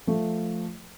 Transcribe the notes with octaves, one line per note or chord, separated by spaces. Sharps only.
F3 A3